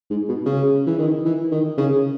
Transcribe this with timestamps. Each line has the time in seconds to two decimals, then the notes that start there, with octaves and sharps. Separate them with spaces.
0.10 G#2
0.29 B2
0.45 C#3
0.87 E3
0.98 D#3
1.25 E3
1.51 D#3
1.78 C#3